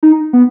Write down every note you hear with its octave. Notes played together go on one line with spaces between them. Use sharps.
D#4
B3